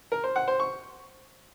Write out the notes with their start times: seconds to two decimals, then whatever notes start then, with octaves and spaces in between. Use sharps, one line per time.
0.12 A#4
0.24 C5
0.36 F#5
0.48 C5
0.60 C#6